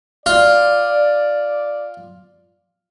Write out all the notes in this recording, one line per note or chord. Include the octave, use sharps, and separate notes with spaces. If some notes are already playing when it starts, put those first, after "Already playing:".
F4 D5